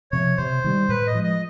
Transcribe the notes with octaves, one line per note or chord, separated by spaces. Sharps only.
C3 F3 C#5
C3 C5
D#3 G3
A2 B4
D#5
F3 G#3
D#5